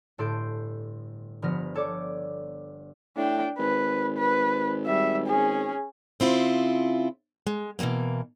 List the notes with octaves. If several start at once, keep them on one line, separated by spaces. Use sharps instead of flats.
G1 A2 A4 C6 G6 D7
G1 F3 B3 F6 A#6
G4 A4 C#5 D5 D6
A2 D4 G5
G#1 B4
B4
G3 E5
C#4 G#4
C#3 C4 E4 F4
G#3
B2 E3 F3 G#3 A#3